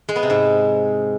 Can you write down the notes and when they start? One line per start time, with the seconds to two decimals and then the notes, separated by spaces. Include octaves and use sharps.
0.09 G#3
0.16 B3
0.23 C3
0.30 G#2